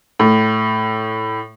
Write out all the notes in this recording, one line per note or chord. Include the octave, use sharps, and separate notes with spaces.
A2